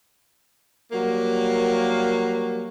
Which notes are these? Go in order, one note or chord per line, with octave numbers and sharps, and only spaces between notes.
F#3 G3 A#3